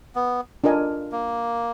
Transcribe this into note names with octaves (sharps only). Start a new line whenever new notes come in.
B3
D4 F4 A#4 D#5 G#5
A#3